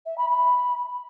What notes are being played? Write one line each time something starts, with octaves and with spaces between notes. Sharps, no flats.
E5
B5
B5